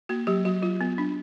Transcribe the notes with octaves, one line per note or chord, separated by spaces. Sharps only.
A#3 F#4
F#3 G4
F#3 F#4
F#3 F4
B3
D4